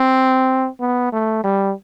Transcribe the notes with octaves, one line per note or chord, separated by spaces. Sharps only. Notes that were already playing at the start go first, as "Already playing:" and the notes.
Already playing: C4
B3
A3
G3